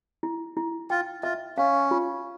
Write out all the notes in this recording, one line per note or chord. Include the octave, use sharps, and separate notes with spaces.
E4
E4
F4 G5
F4 E5
C#4 F5
F4